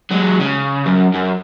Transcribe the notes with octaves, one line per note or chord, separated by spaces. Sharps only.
F#3 G#3
C#3
F#2
F#2